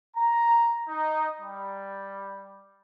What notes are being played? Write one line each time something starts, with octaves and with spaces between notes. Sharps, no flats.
A#5
D#4
G3